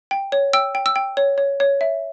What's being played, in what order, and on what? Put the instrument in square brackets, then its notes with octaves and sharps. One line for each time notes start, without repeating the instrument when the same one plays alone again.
[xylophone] G5
C#5
G5 E6
G5
E6
G5
C#5
C#5
C#5
E5